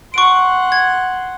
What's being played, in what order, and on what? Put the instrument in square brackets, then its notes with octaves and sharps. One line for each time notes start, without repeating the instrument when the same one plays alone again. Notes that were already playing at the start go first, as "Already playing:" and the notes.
[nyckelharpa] F#5 C6 [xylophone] C#6 D7
[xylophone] G#6